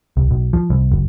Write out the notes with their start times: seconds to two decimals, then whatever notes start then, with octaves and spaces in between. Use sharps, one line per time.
0.17 C2
0.31 B1
0.53 F3
0.70 C2
0.92 F#1